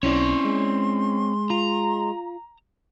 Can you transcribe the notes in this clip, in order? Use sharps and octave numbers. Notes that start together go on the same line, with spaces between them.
B1 C4 C#4 E4 C#5 D5 C6
G#3
F4 A#5